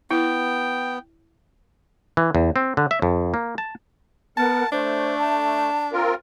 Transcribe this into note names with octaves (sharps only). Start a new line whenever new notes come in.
B3 E4 G5
E3
E2
C4
D3
E5
F2
A#3
A5
B3 A#4 F#5 A5
A3 D4 C5
A5
C4 F4 A#4